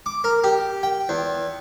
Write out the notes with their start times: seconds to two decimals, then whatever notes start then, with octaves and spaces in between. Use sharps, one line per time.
0.06 D6
0.24 A#4
0.44 G4
0.83 G5
1.09 E2